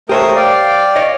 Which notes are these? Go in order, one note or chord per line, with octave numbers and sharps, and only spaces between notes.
A3 G4 A#4 C5 C#5 D#6
D5 F5 G5
C#5 D#5